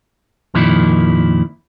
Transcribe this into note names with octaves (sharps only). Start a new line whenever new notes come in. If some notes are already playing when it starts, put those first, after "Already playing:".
F2 A#2 D#3 F3 E4